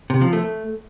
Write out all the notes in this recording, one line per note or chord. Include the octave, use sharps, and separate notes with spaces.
C3
F3
A3